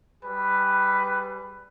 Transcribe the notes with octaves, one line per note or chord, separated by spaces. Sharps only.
G3 G#4 B4